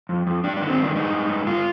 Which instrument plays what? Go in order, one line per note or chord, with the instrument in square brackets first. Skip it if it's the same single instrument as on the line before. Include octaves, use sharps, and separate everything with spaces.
[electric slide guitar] F2
F2
G2 D4
D#3 D4
C4
G2 D4
G2 D#4
G2
G2
G2 F4